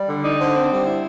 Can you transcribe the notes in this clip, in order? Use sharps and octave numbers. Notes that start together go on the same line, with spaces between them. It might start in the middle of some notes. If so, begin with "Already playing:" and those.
Already playing: G3
D3
D#4 D5
D3 C5
C4
G3
E4